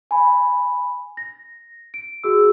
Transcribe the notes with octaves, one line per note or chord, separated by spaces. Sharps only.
G#5 B5
A#6
D7
F#4 G#4 E6